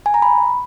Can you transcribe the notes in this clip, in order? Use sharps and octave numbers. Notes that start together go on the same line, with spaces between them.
G#5
A#5
B5